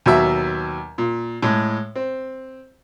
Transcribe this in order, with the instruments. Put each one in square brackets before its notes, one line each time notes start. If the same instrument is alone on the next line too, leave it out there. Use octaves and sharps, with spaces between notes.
[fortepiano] D#2 B2 F#3 E5
A#2
A2 G#3
C4